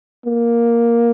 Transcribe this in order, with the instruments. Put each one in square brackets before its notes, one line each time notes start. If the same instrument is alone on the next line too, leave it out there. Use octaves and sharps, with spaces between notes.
[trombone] A#3